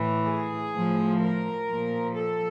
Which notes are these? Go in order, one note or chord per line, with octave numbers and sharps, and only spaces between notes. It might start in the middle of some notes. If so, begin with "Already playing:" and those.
Already playing: A2 E3
G#4
A2 F3
A#4
A#2 F3
A4